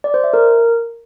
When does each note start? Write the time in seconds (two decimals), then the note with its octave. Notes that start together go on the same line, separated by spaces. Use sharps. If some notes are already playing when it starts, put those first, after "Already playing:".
0.04 D5
0.14 C5
0.24 E5
0.33 A#4